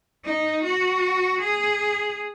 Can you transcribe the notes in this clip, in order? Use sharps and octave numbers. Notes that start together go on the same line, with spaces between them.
D#4
F#4
G#4